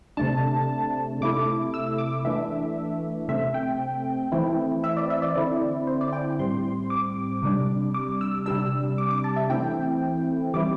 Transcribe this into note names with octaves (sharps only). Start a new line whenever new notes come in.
C3 A3 D4 A5
C3 A3 E4 D6
E6
D6
E3 A3 D4 E5
C3 A3 C4 E5
G5
E3 A3 C4 E4
E5
D5
E5
D5
D3 C4 E4
C5
D5
G5
A2 G3 C4 C6
D6
C3 G3 D4
D6
E6
C3 G3 D4 E6
D6
D6
A5
E5
E3 A3 C4 E4 G5
E3 G3 C4 E4 D6